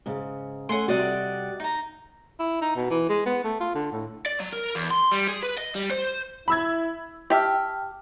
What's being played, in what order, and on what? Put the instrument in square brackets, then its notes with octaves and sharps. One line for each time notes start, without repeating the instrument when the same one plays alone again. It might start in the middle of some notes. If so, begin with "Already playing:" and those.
[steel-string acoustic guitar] G#2 C#3
[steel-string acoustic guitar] A3 C#4 [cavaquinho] F#5 G#5 C6
[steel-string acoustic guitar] C3 G3 F#4 [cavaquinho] D5 D#5 F#5
[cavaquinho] D#4 A#5
[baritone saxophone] E4
D#4
B2
E3
G#3
B3
A3
F4
D3
A2
[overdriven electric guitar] D5
F#3
A#4
E2
C6
G3
G#4
B4
D#5
G3
C5
[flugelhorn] E4 [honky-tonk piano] B5 E6 G#6
[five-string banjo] G4 E5 [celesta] G5 A5 F6